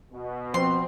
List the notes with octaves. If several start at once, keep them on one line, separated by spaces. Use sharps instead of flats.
B2
F3 C4 C6